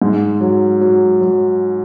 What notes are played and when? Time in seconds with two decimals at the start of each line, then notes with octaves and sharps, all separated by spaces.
0.02 G#2
0.41 F#3
0.81 F#3
1.21 F#3